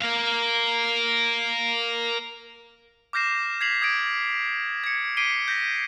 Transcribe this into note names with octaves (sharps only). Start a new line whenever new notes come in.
A#4 F5
D6 F6 G6 A#6 C7 E7
G#6 B6 C7 F7 F#7
D#6 G#6 A#6 D7
G#6 C#7
D6 B6 C7 D7 D#7 G7
G6 A#6 B6 G7